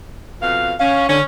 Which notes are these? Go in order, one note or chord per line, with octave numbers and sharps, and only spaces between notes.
F2 B2 F5
C#4 F5
D3 C#4